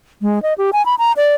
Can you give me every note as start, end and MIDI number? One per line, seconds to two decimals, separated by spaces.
0.22 0.42 56
0.43 0.54 75
0.58 0.71 67
0.73 0.85 80
0.86 0.95 83
0.99 1.12 82
1.17 1.35 74